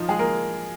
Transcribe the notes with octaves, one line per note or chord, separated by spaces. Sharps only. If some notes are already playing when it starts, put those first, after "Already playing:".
Already playing: F3 D#4 F4
G#3 G#4
A#3 A#4